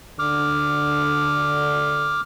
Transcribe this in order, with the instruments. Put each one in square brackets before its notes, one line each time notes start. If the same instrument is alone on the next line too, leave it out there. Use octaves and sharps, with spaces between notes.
[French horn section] D3 [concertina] D6 F6